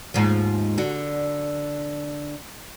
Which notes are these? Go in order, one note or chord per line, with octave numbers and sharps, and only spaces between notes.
D#2 G#2 F3
D3 F#4